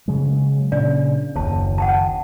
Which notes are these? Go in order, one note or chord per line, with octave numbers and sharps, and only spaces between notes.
C#3 F#3 G#3
A#2 C#3 D4 D5
F#1 D#2 C#5 A5
F#5 G5 A5